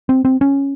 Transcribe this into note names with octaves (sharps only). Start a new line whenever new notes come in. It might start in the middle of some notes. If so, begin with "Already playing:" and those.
C4
C4
C#4